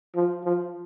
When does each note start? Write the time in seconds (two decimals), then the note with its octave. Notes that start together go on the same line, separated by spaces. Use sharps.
0.15 F3
0.44 F3